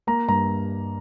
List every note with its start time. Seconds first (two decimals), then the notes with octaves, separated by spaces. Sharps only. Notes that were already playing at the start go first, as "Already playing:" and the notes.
0.07 A#3 A#5
0.28 G2 A#5